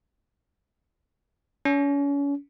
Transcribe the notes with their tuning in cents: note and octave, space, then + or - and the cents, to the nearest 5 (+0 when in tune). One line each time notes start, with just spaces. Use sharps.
C#4 +35